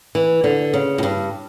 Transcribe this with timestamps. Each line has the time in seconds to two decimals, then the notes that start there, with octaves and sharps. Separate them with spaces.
0.15 E3
0.44 D3
0.73 C#3
0.98 A2
1.03 G2